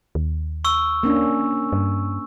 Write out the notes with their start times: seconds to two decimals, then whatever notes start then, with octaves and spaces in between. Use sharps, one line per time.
0.15 D#2
0.65 C#6 E6
1.03 A#3 C#4 D4
1.73 G2